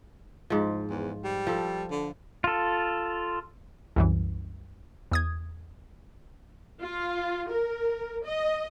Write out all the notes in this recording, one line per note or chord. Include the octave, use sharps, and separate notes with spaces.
G#2 F3
E2
G3
F3 A4
D3
F4 A4
C2 F#2 E3
E2 D#6 G#6
F4
A#4
D#5